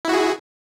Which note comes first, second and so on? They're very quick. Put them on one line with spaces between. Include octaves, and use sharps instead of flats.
E4 F#4 G#4